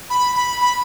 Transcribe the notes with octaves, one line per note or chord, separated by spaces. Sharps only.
B5
B5
B5